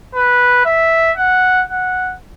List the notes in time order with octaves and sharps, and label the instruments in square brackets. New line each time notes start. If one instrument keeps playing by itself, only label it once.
[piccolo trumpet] B4
E5
F#5
F#5